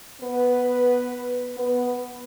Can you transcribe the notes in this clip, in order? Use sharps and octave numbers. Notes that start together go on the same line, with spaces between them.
B3 B4
B3 B4